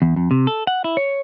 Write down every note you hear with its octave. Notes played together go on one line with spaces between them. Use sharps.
E2
F2
C3
A4
F#5
E4
C#5